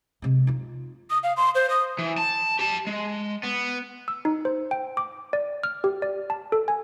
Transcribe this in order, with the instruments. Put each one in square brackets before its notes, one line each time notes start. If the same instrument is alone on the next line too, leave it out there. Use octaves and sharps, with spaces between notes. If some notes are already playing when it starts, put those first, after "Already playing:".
[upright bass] C3 G#3
D#4 F4
[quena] D#6
F5
C6
C5
D#6
[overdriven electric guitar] E3
A5
G4 A5
G#3
B3
[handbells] E6
D#4
C5
G5
D6
D5
F6
G4
D5
A5
A4
G#5